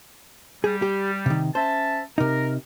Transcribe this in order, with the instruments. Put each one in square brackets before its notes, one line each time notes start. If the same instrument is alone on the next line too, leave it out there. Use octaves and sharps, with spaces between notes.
[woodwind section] G3 [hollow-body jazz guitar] G#4
[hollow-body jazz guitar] G4
C3 D#3
[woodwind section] C#4 E5 A5 [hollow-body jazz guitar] C5
[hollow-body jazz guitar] C3 D#4 [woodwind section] A#4